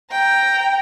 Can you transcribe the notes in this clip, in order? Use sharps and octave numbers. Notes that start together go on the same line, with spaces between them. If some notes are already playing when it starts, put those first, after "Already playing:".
G5 A#5